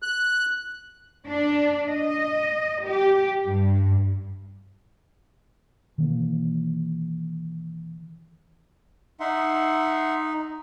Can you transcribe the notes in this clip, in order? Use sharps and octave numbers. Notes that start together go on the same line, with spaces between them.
F#6
D4
D#5
G4
G2
B2 D#3 E3 A#3
D#4 E5 F#5 C6